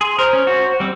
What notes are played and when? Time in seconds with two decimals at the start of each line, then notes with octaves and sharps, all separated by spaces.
0.01 G#4 C6
0.18 A#4 C5
0.33 C#4
0.47 F#4
0.80 G3 C4